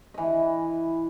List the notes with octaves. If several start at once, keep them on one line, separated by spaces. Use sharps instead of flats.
E3 D#5